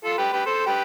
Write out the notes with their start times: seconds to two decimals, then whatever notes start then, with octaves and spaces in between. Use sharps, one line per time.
0.04 F4 A4
0.18 G4 B4
0.33 G4 B4
0.46 A4 C5
0.66 G4 B4